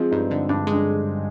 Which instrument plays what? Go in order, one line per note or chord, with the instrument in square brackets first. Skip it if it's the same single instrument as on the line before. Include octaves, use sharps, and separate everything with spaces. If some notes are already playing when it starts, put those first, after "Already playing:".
Already playing: [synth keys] F3 G#3 [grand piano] C4
[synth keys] G2 [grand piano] D#4
[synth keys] D3
[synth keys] G2 [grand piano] D4
[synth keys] G#3
[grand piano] D4